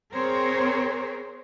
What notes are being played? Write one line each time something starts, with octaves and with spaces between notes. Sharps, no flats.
C4 G#4 A#4 C5 C#5